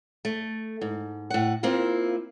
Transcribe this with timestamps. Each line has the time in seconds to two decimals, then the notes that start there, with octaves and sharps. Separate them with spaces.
0.25 A3
0.81 G#2
1.30 A2 F#5
1.63 A#3 C4 E4 F4